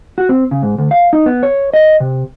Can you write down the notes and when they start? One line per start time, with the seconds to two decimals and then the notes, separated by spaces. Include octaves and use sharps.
0.18 F#4
0.29 C4
0.51 C#3
0.63 G#2
0.79 D2
0.91 F5
1.13 D#4
1.26 B3
1.43 C#5
1.74 D#5
2.00 C3